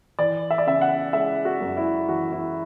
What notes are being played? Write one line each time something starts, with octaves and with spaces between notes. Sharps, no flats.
E3 D5
E5
D5
C#3 E5
F#5
G#3 E5
F#4
F#2
E4
E3 F#4
E4